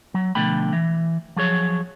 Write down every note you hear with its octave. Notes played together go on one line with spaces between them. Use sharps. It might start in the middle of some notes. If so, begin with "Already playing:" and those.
F#3
B2 D3 F3 A3 G5 B5
E3
F3 F#3 G#4 C#5